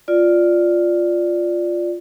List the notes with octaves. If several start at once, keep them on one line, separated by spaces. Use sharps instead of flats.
F4 D5